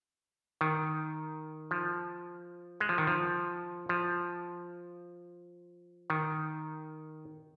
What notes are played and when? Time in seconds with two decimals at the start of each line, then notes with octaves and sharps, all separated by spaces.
0.61 D#3
1.71 F3
2.81 G#3
2.89 F3
2.98 D#3
3.07 F3
3.89 F3
6.10 D#3